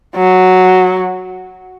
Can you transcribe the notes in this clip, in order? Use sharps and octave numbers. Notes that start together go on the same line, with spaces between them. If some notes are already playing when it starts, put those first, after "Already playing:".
F#3